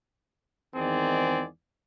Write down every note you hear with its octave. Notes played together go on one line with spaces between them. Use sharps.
E2 G#2 D#3 C4 G#4 D5